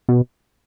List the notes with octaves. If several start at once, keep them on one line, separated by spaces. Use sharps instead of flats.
B2